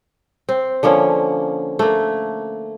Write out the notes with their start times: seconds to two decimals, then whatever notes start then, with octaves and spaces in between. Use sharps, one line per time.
0.49 C4
0.83 D3 F3 A#3 C#4
1.79 A3 A#3